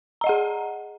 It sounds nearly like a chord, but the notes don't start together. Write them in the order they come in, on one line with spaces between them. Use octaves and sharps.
A#5 D#5 F#5 G#4